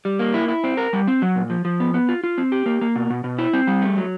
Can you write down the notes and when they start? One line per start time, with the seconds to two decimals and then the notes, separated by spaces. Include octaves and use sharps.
0.05 G3
0.19 A#3
0.34 E4
0.48 E4
0.64 C4
0.77 A#4
0.93 G3
1.08 C4
1.22 F#3
1.36 A#2
1.50 F3
1.65 F3
1.80 B3
1.94 B3
2.09 F4
2.24 F4
2.38 C4
2.52 G4
2.66 A#3
2.81 A#3
2.96 B2
3.10 B2
3.24 B2
3.38 E4
3.53 C4
3.67 G3
3.82 A3
3.96 F#3